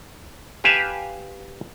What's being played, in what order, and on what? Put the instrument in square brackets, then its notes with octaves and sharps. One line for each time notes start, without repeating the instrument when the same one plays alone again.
[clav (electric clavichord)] G4 B4 F5 G#5 A5